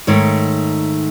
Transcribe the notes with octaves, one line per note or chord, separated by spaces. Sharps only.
G#2 D#3 A3 C#5